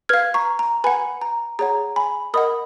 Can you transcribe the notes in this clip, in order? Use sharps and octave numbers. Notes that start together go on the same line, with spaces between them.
B4 F5 F6 G#6
A#5 C#6
A#5
B4 F#5 G#5 B5
A#5
G#4 C#5 F#5 A#5
G#5 B5
A#4 D#5 F#5 B5 D#6